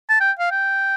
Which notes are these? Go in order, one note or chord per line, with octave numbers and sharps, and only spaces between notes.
A5
G5
F5
G5